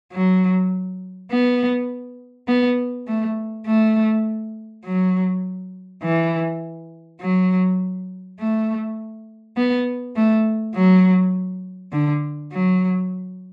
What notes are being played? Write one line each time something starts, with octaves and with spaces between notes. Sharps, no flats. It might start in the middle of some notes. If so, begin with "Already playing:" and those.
F#3
B3
B3
A3
A3
F#3
E3
F#3
A3
B3
A3
F#3
D3
F#3